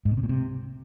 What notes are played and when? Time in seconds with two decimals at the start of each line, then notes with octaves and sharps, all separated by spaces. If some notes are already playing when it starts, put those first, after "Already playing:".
0.05 G#2
0.11 B2
0.17 C3
0.23 A#2
0.29 C3